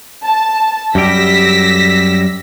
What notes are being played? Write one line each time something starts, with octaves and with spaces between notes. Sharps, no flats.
A5
F#2 G3 G4 E6 A#6 B6